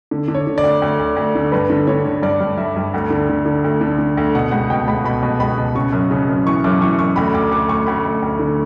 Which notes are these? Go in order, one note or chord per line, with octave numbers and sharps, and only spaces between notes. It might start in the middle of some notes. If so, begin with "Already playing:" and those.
D3
D3
C#5
D3
D5
D2
D2
D2
D2
D3
G2 B4
D3
D3 C#5
D3
G2 D5
G2
G2 E5
G2
D2 F#5
D3
D3
D3
D2
D3
D3
D2
B2 F#5
C#2 F#5
B2 G5
C#2 B5
B2 B5
B2
C#2 B5
B2
C#3 C#6
F#2
C#3
F#2
E3 C#6
F#2 D6
E3 C#6
F#2 C#6
D2 B5
D2 D6
D2 D6
D2 C#6
D2 B5
D2
D2
D3